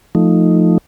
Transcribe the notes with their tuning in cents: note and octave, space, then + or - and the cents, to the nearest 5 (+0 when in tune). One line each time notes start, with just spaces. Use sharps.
F3 +0 A3 +0 D#4 +0